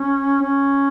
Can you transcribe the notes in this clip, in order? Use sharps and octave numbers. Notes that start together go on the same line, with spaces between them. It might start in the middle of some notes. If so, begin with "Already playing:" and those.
Already playing: C#4
C#4